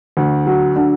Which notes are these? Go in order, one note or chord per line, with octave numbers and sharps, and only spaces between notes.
D2
F#3
D3